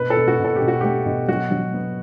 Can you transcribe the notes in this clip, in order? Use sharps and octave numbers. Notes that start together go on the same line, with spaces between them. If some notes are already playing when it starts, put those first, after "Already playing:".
Already playing: B2 B4
A4
B2
F#4
B2
A4
B2 G4
F#4
A3 G4
B2
F#3 F#4
F#3
B3